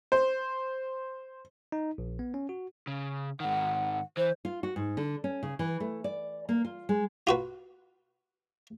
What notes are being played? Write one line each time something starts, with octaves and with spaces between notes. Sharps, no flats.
C5
D#4
A#1
B3
C#4
F#4
C#3
G#2 D#3 F#5
E3 C5
F4
F#4
G#2
D3
C#4
C#3
E3
A3
D5
A#3
F4
G#3
F4 F#4 B4